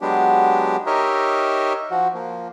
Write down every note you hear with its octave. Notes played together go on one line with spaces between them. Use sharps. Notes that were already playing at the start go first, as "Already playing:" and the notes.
F#3 G#3 B3 D4 G4
D#4 G4 A#4 C#5 D#5 E5
F3 F#4
F3 A#3